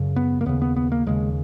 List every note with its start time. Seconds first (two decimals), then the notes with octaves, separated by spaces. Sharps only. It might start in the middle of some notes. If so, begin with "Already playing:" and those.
Already playing: F#2 C#3
0.16 B3
0.41 A#3
0.46 D#2 C#3 B3
0.62 B3
0.76 B3
0.92 A#3
1.07 D#2 C#3 G#3